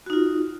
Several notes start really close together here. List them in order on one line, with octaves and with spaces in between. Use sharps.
F#4 D#4 F4